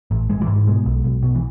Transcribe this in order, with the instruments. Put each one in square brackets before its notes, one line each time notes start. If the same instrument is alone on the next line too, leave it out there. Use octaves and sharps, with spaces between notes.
[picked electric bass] A1
A1 G#3
E3
G#2
B2 G#3
B1
B1
B2
E3